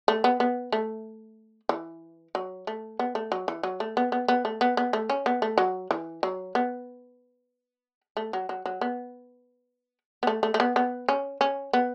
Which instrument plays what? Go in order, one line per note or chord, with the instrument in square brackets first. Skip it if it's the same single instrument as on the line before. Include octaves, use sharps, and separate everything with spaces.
[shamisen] A3
B3
B3
A3
E3
F#3
A3
B3
A3
F#3
E3
F#3
A3
B3
B3
B3
A3
B3
B3
A3
C#4
B3
A3
F#3
E3
F#3
B3
A3
F#3
F#3
F#3
B3
B3
A3
A3
A3
B3
B3
C#4
C#4
B3